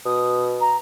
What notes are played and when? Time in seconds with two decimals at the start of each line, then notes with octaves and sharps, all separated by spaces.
0.06 B2 D#6
0.61 A#5